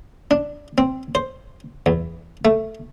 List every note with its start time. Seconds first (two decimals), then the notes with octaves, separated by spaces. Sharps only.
0.31 D4
0.78 C4
1.15 C5
1.86 E2
2.45 A3